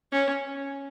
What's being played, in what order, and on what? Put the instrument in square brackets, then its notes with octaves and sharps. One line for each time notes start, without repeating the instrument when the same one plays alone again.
[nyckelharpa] C#4